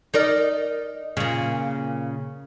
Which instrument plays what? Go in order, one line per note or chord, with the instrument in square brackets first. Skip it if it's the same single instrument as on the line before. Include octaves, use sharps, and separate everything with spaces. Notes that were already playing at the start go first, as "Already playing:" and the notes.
[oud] D#4 A#4 D5
A#2 C#3